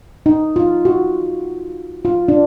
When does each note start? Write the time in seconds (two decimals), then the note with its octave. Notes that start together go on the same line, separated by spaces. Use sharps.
0.26 D#4
0.56 F4
0.85 F#4
2.05 F4
2.28 D4